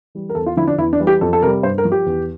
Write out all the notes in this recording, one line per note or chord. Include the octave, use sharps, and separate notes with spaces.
E3 G3
A#4
E2 A4
F4
D3 F3 E4
D4
E2 E4
D4
E3 G3
G4
F2 A4
A4
C3 G3 A#4
G2 C5
A#4
F3
G4
E2